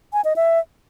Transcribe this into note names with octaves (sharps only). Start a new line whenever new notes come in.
G#5
D#5
E5